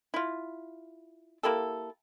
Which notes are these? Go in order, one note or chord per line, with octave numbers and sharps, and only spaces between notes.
E4 F4
A#3 E4 G4 A4